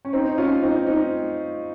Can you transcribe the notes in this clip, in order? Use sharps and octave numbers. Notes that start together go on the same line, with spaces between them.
C#4
C4 D#4
D#4
C#4 F4
C4 D#4
C4 D#4